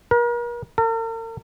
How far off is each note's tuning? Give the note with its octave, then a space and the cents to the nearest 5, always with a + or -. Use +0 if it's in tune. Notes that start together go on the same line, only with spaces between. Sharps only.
A#4 +40
A#4 -45